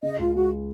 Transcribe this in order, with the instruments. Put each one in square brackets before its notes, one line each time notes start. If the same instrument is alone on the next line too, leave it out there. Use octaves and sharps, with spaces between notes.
[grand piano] C#3 [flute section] D#5
[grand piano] C#2 [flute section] F4
[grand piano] G#3 [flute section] F#4